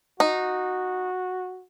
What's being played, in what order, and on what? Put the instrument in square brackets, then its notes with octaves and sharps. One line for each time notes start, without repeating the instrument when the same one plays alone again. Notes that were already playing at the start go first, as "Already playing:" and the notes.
[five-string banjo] D#4 [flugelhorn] F#4